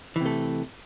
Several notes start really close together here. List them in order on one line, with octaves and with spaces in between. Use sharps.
E3 C3 A3